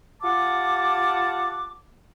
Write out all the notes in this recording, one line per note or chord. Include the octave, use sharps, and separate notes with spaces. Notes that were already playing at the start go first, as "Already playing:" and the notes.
F4 G4 F#5 A5 D6